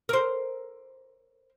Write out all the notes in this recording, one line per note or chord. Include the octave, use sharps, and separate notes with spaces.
A#4 C5